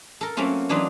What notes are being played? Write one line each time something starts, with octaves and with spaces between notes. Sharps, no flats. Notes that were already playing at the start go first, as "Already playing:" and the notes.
A4 A#4
F#3 A3 A#3 C4 C#4 F4
E3 F#3 D4 D#4 F4 B4